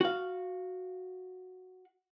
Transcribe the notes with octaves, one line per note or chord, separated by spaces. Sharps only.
F#4 F5